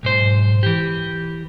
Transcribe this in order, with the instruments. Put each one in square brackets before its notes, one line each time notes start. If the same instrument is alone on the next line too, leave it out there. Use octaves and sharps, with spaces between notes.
[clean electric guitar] B1 G#2 C5
E3 G4